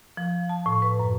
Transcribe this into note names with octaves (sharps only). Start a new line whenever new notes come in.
F3
A5
A2
B4
F#2